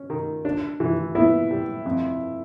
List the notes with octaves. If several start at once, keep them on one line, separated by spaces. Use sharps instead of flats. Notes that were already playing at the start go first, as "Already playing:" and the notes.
Already playing: C#4
D#3
D4
E3
B3 E4
G3
F2